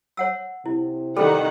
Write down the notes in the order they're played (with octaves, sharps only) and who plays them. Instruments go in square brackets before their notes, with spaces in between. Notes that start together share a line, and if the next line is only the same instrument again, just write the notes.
[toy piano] C#5 F#5 E6
[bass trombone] C3 [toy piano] E4
[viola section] D#3 F#5 [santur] G3 [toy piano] A4